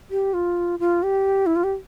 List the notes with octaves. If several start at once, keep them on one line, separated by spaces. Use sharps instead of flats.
G4
F4
F4
G4
E4
F4
G4